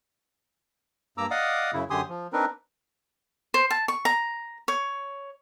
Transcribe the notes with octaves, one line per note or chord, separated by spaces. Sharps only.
G2 A#3 A#5 D6 E6
D5 D#5 F5 F#5 D6 D#6
F#2 C#3 E4
F#2 D3 G4 G#5 C6 D#6
F3
C4 D4 D#4 A#4 B4
C5
A5
C#6
A#5
C#5